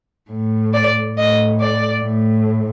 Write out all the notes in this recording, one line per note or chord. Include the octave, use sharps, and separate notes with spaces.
A2
D5
A2 D#5
D5
A2